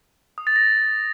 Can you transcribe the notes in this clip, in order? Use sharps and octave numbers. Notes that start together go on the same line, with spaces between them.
D#6
A6
A#6